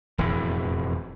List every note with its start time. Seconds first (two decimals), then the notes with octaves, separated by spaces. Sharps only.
0.18 E1 F2 A2 E3